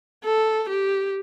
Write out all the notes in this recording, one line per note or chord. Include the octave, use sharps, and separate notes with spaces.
A4
G4